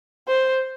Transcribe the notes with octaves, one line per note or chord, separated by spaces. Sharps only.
C5